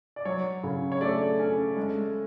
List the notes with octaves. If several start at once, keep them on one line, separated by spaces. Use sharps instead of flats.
D5
F#3 C#5
C#3
C#5
A3 D5
C#4
G#3